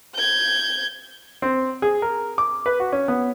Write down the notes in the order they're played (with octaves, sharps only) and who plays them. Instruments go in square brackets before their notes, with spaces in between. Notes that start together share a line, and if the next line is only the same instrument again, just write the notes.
[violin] G6 G#6
[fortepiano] C4
G#4
A#4
D6
B4
F#4
C#4
B3